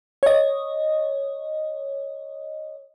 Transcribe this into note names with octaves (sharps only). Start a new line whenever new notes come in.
C#5 D#5